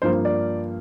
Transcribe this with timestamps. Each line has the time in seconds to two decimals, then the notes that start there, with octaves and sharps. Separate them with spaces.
0.02 G2 F3 A#3 C5
0.25 D5